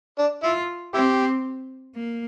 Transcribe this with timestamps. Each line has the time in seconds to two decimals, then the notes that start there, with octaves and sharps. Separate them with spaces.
0.18 D4
0.43 E4 F4
0.94 C4 E4 G4
1.96 A#3